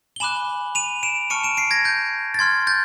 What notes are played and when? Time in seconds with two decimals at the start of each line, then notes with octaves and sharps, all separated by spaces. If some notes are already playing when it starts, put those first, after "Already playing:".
0.16 G7
0.20 G#5 B5 D6 F#6 E7 F#7
0.75 D#7 F7
1.03 D7 E7
1.30 A5 C#6 F6 C#7 D#7
1.44 D7 E7
1.57 C7 D7
1.71 G#6 A#6
1.85 G6
2.34 A6
2.39 C6 F6 G#6
2.67 G6 A6